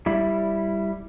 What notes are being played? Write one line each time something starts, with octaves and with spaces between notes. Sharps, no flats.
G3 E4